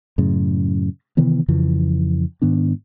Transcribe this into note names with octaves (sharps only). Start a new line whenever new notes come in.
F#2 A2 C#3
C3 D#3 E3 B3
F2 C#3 E3 F3
G#2 D#3 B3 D4